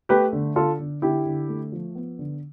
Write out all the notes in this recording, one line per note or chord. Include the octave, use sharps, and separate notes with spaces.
A3 G4 B4
D3
D3 F4 A4
D3
D3 E4 G4
D3
A3
F3
B3
D3